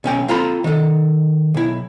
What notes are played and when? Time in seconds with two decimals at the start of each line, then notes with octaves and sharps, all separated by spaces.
0.04 B1 C#4 G5
0.28 C4 F4 A4 A#5 B5
0.64 D#3 A4
1.54 B1 E4